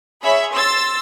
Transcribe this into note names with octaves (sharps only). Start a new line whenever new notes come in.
G#4 C#5 E5 B5
C6 E6 A6